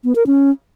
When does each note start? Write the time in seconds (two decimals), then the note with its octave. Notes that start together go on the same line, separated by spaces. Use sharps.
0.04 B3
0.15 A#4
0.27 C#4